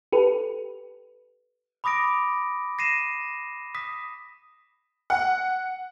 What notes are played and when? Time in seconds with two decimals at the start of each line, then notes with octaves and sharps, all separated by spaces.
0.13 G4 A4 B4
1.84 B5 D6 D#6 A#6 D7
2.79 A#6 C7 D#7 E7
3.75 D#6 B6
5.10 F#5